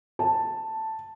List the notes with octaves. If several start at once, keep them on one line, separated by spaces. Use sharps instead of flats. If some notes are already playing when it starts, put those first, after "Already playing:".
A5